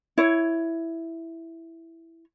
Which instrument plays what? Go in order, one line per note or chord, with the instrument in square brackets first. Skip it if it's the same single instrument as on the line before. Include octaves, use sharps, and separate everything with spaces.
[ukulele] E4 C#5